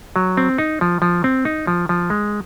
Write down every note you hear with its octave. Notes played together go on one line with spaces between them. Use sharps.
F#3
C4
D#4
F3
F3
C4
D#4
F3
F3
G#3